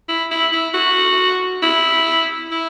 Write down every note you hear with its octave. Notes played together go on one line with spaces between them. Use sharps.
E4
E4
E4
F#4
E4
E4